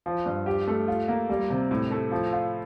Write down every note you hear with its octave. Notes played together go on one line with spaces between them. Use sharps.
F3
G2
G4
A3
F4
A#3
G3
C3
A2
A3
F3
F4